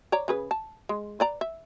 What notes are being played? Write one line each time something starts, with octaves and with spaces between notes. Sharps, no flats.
C#5 D5 A#5
C#3 G#4 B4
A5
G#3
B4 D5 A#5
E5